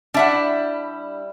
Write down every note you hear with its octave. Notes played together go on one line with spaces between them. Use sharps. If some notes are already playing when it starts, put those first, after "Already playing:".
G3 D4 E4 E5 F#5